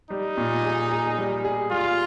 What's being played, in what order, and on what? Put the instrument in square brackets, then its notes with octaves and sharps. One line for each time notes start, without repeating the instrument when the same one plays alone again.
[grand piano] G3 [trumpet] D#4
[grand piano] A#2
G#4
G#4
G3
G#4
[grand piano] G3 [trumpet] F4